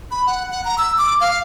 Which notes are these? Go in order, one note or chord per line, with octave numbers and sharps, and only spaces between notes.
B5
F#5
F#5
A#5
E6
D6
F5